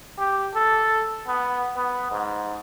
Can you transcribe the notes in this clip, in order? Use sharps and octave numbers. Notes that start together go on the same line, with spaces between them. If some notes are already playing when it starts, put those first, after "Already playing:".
G4
A4
B3
B3
G#2